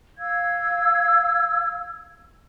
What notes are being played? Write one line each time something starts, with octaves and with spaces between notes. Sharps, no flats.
F5 E6 G#6